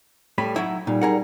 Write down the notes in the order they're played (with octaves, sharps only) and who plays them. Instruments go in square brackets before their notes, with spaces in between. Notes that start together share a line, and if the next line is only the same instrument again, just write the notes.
[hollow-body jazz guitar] A2 G3 B5
F#3 D#4 E4
[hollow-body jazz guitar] A#2 [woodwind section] G3 D#4
[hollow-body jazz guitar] G#4 A#4 F#5